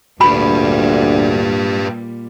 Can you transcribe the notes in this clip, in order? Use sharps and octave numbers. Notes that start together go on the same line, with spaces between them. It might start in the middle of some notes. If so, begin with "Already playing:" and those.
D2 A#2 G3 G4 B4 B5